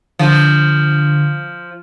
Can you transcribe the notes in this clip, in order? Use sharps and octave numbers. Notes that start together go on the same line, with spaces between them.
D3 F3